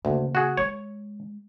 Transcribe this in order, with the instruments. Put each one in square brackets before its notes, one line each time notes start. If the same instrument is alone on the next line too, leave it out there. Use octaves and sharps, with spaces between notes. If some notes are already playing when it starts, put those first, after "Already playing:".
[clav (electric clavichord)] D2 [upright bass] C#3 A#3
[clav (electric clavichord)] F#4 G#4
[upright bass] G#3 [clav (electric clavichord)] C#5